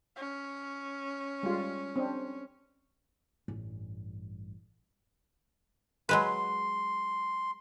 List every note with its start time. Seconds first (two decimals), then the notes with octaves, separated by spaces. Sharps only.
0.16 C#4
1.43 G3 G#3 F4
1.96 C4 D4
3.48 A1 G2
6.09 F#3 G#3 B4 C6